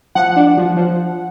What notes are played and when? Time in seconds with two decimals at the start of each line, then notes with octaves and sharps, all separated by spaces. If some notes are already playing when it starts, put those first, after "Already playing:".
0.15 F3 F#5
0.36 D4
0.57 F3
0.77 F3